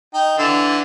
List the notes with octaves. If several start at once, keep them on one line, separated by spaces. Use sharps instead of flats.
D#4 G5
D3 E3 E6